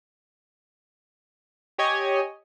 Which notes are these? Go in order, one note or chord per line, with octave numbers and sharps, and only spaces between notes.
G4 C#5 D#5 G#5